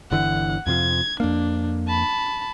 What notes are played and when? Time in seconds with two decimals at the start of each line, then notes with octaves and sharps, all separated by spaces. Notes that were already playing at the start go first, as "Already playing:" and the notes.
0.11 G1 D3 E3 F#5
0.67 F2 C3 F3 G#6
1.20 F2 A#3 D4
1.88 A5 B5